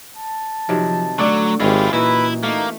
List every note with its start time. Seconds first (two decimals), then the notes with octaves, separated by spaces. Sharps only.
0.17 A5
0.69 C3 D#3 F3 F#3
1.19 D3 F#3 A3 D5 F#5
1.60 G#1 G#3 C#4 E4 F4 G4
1.93 A#2 E3 D#4 E4 F#4 B4
2.43 A3 A#3 D#4